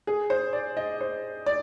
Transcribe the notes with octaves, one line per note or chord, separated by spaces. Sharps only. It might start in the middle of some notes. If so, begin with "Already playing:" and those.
G#4
C5
D5
D#5
C5
D5